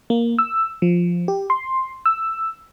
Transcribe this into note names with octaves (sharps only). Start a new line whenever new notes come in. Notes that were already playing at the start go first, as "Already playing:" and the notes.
A#3
E6
F3
G4
C6
E6